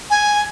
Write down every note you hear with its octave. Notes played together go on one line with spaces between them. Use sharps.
G#5